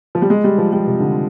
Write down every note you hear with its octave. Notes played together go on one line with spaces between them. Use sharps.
F3
G3
G#3
G3
F3
G3
C3
D3